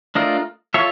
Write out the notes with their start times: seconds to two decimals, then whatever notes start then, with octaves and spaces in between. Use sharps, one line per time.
0.15 A3 D4 F4 A#4 D#5
0.74 F4 A4 C#5 E5